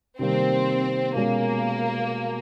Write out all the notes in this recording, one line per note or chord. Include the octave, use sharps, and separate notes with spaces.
C3 D#3 G3 A#3 C4
B2 G#3 A#3 C#4